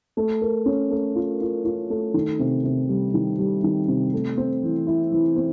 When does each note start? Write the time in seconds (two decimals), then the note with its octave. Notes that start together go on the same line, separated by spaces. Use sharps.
0.17 A3
0.42 A#4
0.66 C#4
0.91 A3
1.15 F4
1.41 F4
1.65 F4
1.90 A3
2.14 D#3
2.39 C3
2.64 C3
2.88 G3
3.14 D#3
3.39 G3
3.63 D#3
3.88 C3
4.13 A3
4.37 C4
4.63 E3
4.87 E4
5.12 E3
5.36 C4